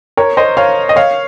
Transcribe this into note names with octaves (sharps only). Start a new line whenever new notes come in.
A#4 C#5
C5 D#5
C#5 F5
D#5
C#5 F5